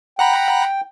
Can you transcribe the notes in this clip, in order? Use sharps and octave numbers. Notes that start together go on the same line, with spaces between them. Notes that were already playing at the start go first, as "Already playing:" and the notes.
F#5 G5 A#5 B5